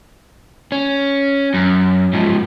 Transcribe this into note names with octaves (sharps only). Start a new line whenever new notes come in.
C#4
F#2
G#2 F3